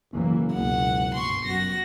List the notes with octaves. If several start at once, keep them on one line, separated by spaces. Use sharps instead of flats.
F#1 E3 F#3 A#3
C#2 B2 G#3 F#5
G1 C6 C#6
F#2 F#4 A#6